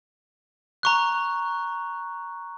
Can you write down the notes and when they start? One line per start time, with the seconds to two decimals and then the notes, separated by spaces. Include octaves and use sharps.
0.83 A#5 C#6 F#6